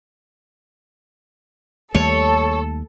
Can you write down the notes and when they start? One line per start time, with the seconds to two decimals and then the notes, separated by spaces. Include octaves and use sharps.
1.95 D#2 G3 A3 A4 C#5